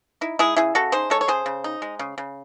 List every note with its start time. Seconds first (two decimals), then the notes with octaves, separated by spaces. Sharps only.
0.21 D#4 E4
0.39 G#3 E4 G#4
0.57 C#3 E4 G#4
0.75 C#3 F#4 A4
0.92 D#4 G#4 C5
1.10 G#3 A4 C#5
1.21 C#5
1.28 C#3 G#4 C5
1.46 C#3
1.64 D#4
1.82 G#3
1.99 C#3
2.18 C#3